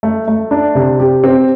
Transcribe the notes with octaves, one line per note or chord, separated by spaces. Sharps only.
A3
A3
D4
C3
G4
C4